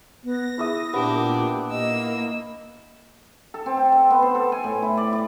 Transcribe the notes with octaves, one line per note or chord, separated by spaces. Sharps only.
B3 A#6
E4 G#4 E5 D#6
A#2 B3 D4 G4
A#3 D#5 E6
A4
C4
G5
A5
B3
C5
A4
G#5
A2
E4
D5
D5